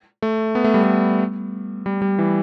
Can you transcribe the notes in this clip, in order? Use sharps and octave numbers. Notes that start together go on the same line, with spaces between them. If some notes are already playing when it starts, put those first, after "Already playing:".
A3
B3
A3
G3
A3
G3
G3
E3